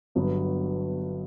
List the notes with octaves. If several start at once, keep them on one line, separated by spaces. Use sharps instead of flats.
G1 G2 F#3 B3